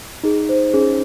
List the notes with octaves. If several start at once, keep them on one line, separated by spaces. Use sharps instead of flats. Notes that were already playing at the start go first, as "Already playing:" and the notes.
D#4 G#4
C5
C#4 G#4